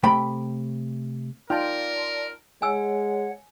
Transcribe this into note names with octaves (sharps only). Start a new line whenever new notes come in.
C3 A3 G5 B5
D#4 F4 A#4 D5 G5 A5 C6 F6
G#3 C#5 F#5 G#5 E6